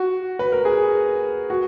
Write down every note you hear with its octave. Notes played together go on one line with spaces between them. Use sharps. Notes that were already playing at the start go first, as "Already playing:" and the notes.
Already playing: F#4
B4
A#4
G#4
F#4